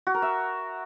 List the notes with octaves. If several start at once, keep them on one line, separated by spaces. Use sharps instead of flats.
F#4
A#4
E5